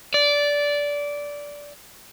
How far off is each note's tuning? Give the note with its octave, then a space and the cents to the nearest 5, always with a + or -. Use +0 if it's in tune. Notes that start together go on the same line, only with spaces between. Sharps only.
D5 -15